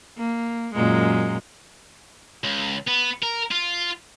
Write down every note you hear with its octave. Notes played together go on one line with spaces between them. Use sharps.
A#3
F#2 A#2 G#3
C#2
B3
A#4
F4